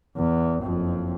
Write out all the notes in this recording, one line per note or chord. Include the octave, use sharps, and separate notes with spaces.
E2
F#1 F2